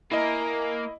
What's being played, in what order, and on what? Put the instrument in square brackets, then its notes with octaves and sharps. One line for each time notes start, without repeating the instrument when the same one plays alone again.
[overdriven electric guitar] A#3 [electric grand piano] E4 D#5 [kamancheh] G#5 A#5